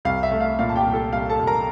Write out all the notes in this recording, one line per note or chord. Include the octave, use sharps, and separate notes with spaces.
C2 F5
E5
A3
F5
A#2 F5
A5
G4 G5
C2
A4 A5
C2 F5
A4 A5
C2
A#4 A#5